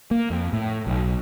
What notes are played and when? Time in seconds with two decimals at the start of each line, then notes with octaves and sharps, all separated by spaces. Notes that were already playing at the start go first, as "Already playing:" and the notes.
0.11 A#3
0.30 F2
0.53 A2
0.87 B1